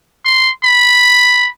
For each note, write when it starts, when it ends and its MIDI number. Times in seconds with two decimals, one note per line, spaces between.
0.25 0.50 84
0.64 1.49 83